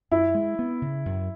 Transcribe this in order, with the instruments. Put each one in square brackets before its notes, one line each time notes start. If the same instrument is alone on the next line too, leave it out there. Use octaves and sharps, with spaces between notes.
[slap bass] F#2 [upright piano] E4
[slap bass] G#3
B3
C#3
F#2